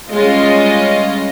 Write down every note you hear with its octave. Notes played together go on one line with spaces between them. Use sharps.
G3 G#3 C#4 F4 D#5